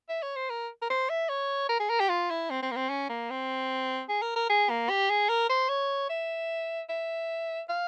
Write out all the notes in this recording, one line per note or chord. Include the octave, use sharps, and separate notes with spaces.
E5
C#5
C5
A#4
A#4
C5
E5
C#5
A#4
G#4
A#4
G4
F4
E4
C4
C4
A#3
C4
C#4
A#3
C4
G#4
A#4
A#4
G#4
A#3
G4
G#4
A#4
C5
C#5
E5
E5
F5